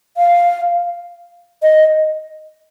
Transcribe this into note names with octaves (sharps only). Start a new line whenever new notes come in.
F5
D#5